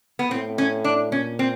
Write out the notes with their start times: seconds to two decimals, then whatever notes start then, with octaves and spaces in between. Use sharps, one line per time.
0.19 B3
0.31 A2 C4
0.58 C#4
0.84 D4
1.12 A#2 C#4
1.39 C4